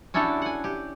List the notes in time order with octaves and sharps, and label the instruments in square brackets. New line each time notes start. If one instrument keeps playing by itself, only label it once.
[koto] C#4 D4 E4 F#4 G4 A4
F#5 G#5
G4